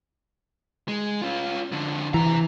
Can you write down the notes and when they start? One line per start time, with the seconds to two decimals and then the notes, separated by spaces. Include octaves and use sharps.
0.88 G#3
1.22 C#4 F4
1.72 F2 D3
2.14 C3 E3 A#5